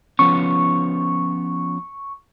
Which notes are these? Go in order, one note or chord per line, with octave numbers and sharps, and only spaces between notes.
F3 B3 C#4 C#6